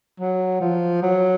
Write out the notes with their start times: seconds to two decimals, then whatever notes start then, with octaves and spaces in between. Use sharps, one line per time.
0.20 F#3
0.61 F3
1.03 F#3